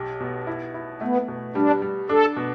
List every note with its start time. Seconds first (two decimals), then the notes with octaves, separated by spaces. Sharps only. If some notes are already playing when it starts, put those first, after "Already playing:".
Already playing: B1 G4
0.20 B2
0.47 E4
0.74 E4
1.01 A3 B3
1.28 B2
1.55 G3 D4
1.82 G3
2.09 D4 A4
2.37 B2